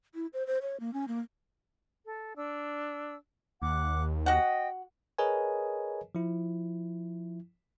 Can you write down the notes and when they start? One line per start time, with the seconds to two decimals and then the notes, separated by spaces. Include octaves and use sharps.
0.15 E4
0.33 C5
0.47 C5
0.62 C#5
0.80 A#3
0.94 C#4
1.08 A#3
2.06 A4
2.35 D4 E6
3.62 D#2 F#5 D6 F#6
4.26 F#4 D#5 F#5 G5
5.18 G#4 A#4 B4 C#5 D#5 G#5
6.15 F3 E4